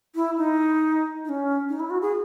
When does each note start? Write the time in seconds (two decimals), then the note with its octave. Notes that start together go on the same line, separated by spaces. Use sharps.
0.15 E4
0.38 D#4
1.25 D#4
1.29 C#4
1.69 D#4
1.80 E4
1.90 F#4
2.02 G#4